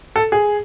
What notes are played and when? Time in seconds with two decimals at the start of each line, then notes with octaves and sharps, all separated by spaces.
0.16 A4
0.32 G#4